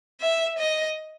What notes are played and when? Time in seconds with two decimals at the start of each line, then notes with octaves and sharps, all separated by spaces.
0.21 E5
0.58 D#5